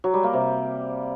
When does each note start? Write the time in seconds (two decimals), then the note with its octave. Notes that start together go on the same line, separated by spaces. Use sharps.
0.04 F#3
0.14 G3
0.24 A#3
0.33 C3